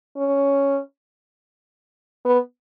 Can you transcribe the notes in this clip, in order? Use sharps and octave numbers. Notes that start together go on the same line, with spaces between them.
C#4
B3